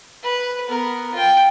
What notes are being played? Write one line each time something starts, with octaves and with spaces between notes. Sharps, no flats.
B4
B3 A#4
F4 G5